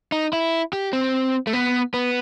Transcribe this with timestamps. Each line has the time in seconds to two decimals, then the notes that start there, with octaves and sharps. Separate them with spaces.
0.12 D#4
0.33 E4
0.73 G4
0.93 C4
1.47 A3
1.53 B3
1.94 B3